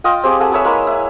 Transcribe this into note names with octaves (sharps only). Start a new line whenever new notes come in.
F4 D#5 G5
C4 G4 G#4 D6
A4 F#5 G#5
G#4 B4 C#5 E5
G#3 A#3 E4
E4